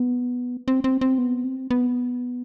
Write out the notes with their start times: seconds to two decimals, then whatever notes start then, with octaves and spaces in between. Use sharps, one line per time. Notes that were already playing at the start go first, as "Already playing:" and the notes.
Already playing: B3
0.68 C4
0.84 C4
1.01 C4
1.18 B3
1.44 C4
1.71 B3